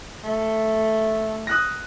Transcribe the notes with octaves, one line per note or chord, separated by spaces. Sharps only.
A3
D#6 F#6 A#6